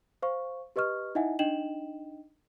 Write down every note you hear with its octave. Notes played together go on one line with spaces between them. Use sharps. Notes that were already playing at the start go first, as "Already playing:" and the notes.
C5 F5 C#6
G4 B4 D#5 C#6 F6
D#4 E4 D#5 E5 F#5 G#5
D4 D#4 D#5 G5 E7 F#7